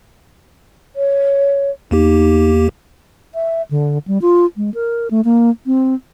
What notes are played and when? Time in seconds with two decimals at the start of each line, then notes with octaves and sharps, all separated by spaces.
0.96 C#5
1.91 E2 A#3 D#4 G4
3.34 E5
3.71 D3
4.07 G3
4.22 F4
4.57 G#3
4.74 A#4
5.11 A3
5.25 A#3
5.66 C4